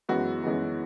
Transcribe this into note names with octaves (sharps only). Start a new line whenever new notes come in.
F#2 E3 G#3 B3 F#4
F#2 E3 G#3 B3